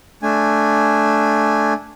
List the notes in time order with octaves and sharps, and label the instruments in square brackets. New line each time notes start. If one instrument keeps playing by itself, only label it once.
[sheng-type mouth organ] A3 D4 G#5